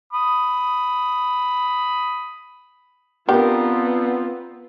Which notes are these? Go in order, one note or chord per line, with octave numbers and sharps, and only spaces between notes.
B5 D#6
B3 C4 D4 F4 G4 A#4